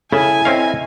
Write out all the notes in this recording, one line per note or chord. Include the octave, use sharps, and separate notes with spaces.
C#3 E4 A4 G#5
C4 C#4 D#5 F5